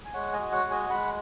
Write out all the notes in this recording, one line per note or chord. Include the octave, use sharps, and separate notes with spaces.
G#5
G#3 C#5 F#5
D#5 G#5
F#4
C#5 F#5
G#3
D#5 G#5
G#3 F#5 B5